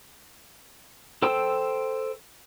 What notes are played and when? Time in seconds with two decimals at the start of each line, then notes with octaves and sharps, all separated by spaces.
1.22 A4 C5 G5 E6